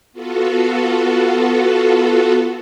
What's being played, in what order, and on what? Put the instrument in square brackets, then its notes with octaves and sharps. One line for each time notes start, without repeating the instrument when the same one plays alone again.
[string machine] B3 F4 F#4 A4